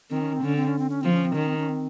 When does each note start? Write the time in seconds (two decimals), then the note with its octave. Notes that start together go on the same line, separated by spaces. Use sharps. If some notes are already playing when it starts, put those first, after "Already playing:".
0.10 D#3 C4
0.21 C#4
0.33 C4
0.42 D3 C#4
0.56 C4
0.68 C#4
0.78 C4
0.90 C#4
1.01 F3 C4
1.12 C#4
1.24 C4
1.35 D#3 C#4
1.47 C4
1.57 C#4
1.69 C4